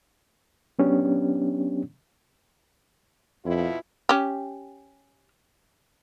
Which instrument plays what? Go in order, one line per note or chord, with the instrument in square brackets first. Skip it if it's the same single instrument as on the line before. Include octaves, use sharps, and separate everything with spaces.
[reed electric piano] F#3 B3 C#4 D4 G4
[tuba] F2 [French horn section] B2 E4 F4
[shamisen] C#4 G4